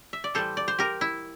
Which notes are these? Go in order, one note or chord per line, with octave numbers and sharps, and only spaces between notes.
E5
D5
A2 E3 G3 A4 C5
D5
C5
G4 A#4
E4